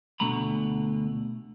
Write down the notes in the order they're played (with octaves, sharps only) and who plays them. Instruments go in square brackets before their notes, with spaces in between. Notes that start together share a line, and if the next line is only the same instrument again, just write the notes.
[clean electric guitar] D2 B2 D3 A3 A#5 B5